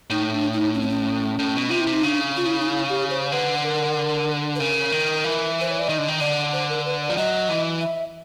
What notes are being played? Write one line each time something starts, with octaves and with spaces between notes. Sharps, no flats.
A2 D#4
D4
D#4
C#4
C4
C#4
A2
B2
C3 F4
E4
C3
D#4
C#3 D4
F4
E4
D#4
E4
G4
C5
D3 B4
A#4
B4
C#3 A#4
D#3
E3
C5
C#5
D5
D#3 D#5
D3
D#3
D3 D5
C5
A#4
B4
D5
F3
F#3 D#5
E3
E5